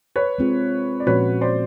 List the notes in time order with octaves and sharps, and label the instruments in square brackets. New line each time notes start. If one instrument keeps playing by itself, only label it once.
[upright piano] B4 C#5
[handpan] G#3 C4 F4 G#4
[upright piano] D5
[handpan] A#2 F3 G#3 C#4 F#4 [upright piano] B4 C#5
[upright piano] C5 D5